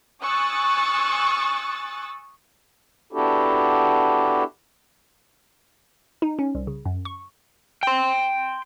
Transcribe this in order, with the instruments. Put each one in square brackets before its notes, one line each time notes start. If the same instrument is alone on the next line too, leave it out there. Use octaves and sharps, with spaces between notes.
[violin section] G#5 C#6 D#6 E6 F#6 A6
[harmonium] B3 D4 E4 F#4 G4 A4
[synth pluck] D#4
C#4
C2
C#3
F#2
C#6
[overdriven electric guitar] G5 C6